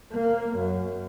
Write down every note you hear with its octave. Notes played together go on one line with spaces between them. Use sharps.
A#3
F#2